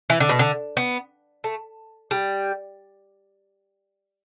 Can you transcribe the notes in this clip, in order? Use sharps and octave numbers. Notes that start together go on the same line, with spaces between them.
E3
D3
B2
D3
B3
A3
G3